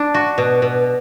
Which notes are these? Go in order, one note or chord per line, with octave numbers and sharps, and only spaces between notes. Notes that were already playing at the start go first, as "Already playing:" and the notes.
Already playing: D4
F#4
B2
B2